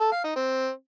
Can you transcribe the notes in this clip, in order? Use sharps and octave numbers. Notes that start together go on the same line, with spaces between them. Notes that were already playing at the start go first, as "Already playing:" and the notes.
A4
F5
D#4
C4